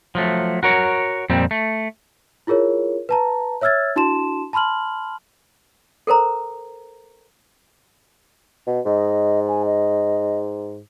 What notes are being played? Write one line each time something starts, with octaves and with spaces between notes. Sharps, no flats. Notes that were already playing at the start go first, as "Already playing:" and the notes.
F3 F#3 A3
F#4 A#4 C#5
F2 A#2 G3 C4
A3
E4 F4 G#4 A#4 C#5
B4 A5 A#5
C#5 E5 E6 F6 G#6 A6
D4 E4 F#4 A5 C6 E7
A5 B5 C6 F6 F#7
A4 A#4 C5 A#5
B2
G#2 D#5
G#5
D#5